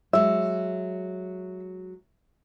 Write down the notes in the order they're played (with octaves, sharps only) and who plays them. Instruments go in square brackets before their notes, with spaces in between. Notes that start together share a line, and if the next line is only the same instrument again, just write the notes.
[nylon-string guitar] F#3 G#3 [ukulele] E5